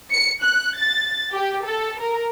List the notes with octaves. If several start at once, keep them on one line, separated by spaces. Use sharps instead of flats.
C#7
F#6
A6
G4
A4
A#4